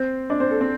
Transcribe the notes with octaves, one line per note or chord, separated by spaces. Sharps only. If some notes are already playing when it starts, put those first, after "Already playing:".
Already playing: C4 C5
D4 D5
C4 C5
A4
C4 C5